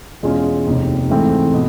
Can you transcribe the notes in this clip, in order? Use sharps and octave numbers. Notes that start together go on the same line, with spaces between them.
E2 B2 G#3 C#4 F4
F1 D#2 D#3
G#2 E3 A3 C4
B2